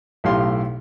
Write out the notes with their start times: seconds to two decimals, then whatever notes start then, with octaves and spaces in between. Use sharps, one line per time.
0.24 B1 A2 G4 F5 C6